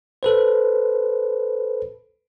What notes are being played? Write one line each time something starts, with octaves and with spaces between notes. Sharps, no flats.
A4 B4 C5